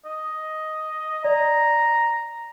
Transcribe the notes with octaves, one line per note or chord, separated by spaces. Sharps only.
D#5
D5 A#5